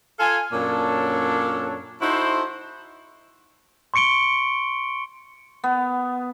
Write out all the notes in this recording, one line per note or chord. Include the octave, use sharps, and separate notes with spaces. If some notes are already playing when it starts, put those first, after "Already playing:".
F4 A4 F5 G#5
F#2 A#2 A#3 D4 A4 C#5
D#4 E4 F#4 A4 C5
C6 C#6 C#7 D7 G7
B3